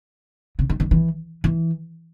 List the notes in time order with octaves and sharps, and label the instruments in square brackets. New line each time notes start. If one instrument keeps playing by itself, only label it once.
[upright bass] C#3
D#3
D#3
E3
E3